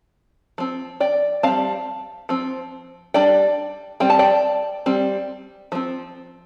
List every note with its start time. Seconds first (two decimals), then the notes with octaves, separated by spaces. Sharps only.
0.58 F3 C4
1.00 D5 G5
1.43 G3 C4 F5 A5
2.29 F3 C4
3.14 G3 D4 D5 G5
4.00 G3 C4 G5
4.10 A5
4.19 D5 G5
4.86 G3 C4
5.72 F3 C4